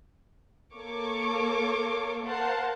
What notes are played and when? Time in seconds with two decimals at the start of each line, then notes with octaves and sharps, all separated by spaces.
0.75 A#3 A4 C#5 C#6 D6
2.25 A#4 C5 F5 F#5 A5